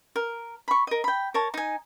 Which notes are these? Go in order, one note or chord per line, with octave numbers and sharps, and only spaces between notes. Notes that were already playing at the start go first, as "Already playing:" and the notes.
A#4
B5 C#6
A#4 D#5
G5 B5
A#4 C#5 A5
D#4 G#5